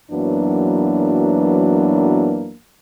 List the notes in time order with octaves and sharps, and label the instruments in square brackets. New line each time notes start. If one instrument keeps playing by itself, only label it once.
[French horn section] F#2 E3 F#3 A#3 B3 D4